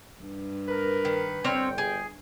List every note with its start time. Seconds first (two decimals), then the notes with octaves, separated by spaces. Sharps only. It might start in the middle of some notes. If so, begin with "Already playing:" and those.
0.22 G2
0.68 A#4 B4
1.05 D#3
1.44 G1 C4 C#5 F5 G5
1.78 G#4